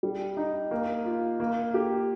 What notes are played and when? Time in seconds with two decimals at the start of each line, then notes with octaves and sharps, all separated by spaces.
0.03 G3
0.37 D#4
0.71 A#3
1.06 F4
1.40 A#3
1.74 G4